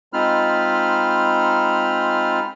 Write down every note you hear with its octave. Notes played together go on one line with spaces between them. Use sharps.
G#3 C4 D#4 F4 B5 F6